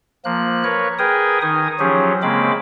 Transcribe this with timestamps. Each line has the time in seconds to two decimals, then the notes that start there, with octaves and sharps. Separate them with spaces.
0.25 F3 A#3 F#6
0.64 A#4 B4 C#5
0.99 G#4 A#4 B4 G5 G#5 D#6
1.42 D#3 D#4 G#5 D#6
1.79 F3 F#3 C#4 G4 G#4
2.23 C#3 G#3 A#3 C4 B5 D6